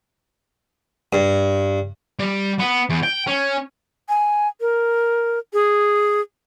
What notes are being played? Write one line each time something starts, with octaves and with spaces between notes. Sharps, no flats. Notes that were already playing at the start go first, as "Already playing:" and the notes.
G2
G3
B3
E2
G5
C#4
G#5
A#4
G#4